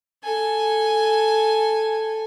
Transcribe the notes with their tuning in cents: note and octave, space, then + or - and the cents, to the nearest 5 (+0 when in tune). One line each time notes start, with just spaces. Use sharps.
A4 +0 G#5 +0